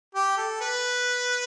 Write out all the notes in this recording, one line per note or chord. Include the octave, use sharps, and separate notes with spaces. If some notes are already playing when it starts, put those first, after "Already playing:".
G4
A4
B4